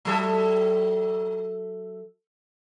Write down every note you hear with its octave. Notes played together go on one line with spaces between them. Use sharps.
F#3 A4 E5